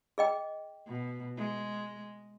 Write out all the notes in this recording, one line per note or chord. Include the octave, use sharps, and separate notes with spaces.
G#4 D#5 G5
B2
G#3